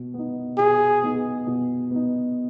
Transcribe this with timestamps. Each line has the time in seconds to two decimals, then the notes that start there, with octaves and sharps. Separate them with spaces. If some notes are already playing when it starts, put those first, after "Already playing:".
Already playing: B2
0.14 B3 D#4
0.58 B2 G#4
1.02 B3 D#4
1.47 B2
1.91 B3 D#4